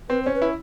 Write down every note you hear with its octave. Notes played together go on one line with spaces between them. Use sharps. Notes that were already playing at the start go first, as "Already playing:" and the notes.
C4 B4
C#4 C5
B4
E4